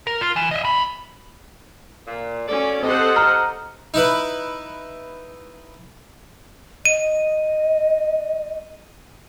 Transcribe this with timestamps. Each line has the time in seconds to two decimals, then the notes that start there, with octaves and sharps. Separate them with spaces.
0.07 A#4
0.21 F4
0.36 E3
0.51 D#5 E5
0.65 A#2 B5
2.07 A#2
2.48 C#4 F#4 A4 D5
2.83 C4 G4 A4 C5 D#5 F#5
3.16 A#5 F6
3.94 D#4 E4 B4
6.85 D#5 D#7